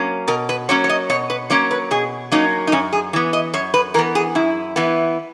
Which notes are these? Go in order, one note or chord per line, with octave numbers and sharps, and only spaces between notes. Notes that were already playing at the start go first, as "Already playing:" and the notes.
Already playing: F#3 A#3 C#4
B2 A#4
B4
F#3 A#3 C#4 C#5
C#5
D#5
B2 C#5
B4
F#3 A#3 C#4 C#5
B4
B2 G#4
F#3 A#3 C#4 D#4
D#4
F#2 C#4
G#4
E3 B3
D#5
F#2 C#5
B4
E3 B3 A#4
G#4
F#2 E4
E3 B3